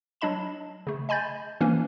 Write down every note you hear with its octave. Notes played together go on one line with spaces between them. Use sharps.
F#3 D4 D#5 B5 E7
C#3 A3
D#5 G#5 B5 G6 A6
E3 F3 A#3 C#4 D4